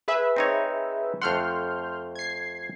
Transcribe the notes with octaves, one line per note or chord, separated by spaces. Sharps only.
G#4 B4 E5
C4 D#4 C#5
F2 A3 F#5 C6 F6 G6
G#6 C7